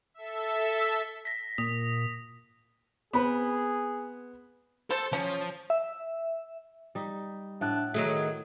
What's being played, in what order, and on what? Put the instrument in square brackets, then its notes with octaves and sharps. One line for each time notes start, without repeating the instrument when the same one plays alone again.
[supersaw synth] A4 E5
[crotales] A#6 B6
[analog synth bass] A#2 [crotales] D#6
[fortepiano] B3 C4 B4 [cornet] G#4
[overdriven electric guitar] A4 A5 [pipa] C5
[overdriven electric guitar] F3 [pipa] C#4
[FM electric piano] E5
[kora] G3 D#4
[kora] A2 [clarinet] D4 [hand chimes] E5 F#5 F#6
[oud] D#3 F#3 A3 [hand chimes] F#4 D7 [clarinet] G#4